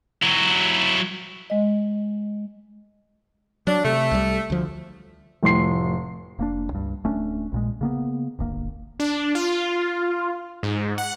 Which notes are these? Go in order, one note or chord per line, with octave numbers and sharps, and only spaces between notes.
F#3 E4
G#3 D#5
F#3 D4
C3 A3
C2 F#3 G3
D2 F3
F1 A2 C6 C7
F1 A#3 D4
C#2 G2
D1 A3 C#4 D4
A#1 A#2 G#3
C#3 A#3 B3
D1 G1 A#3
D4
F4
G#2
F#5